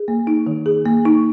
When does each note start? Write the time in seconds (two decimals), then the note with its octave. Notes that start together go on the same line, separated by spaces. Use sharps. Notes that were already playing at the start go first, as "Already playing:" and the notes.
Already playing: G#4
0.08 A#3
0.27 D#4
0.47 D#3
0.66 G#4
0.85 A#3
1.05 D#4